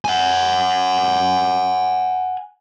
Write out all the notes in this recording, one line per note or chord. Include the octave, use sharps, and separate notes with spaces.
F#5 G#5